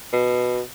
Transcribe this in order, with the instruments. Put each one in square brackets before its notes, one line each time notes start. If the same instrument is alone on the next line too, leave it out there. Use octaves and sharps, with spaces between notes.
[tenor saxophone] B2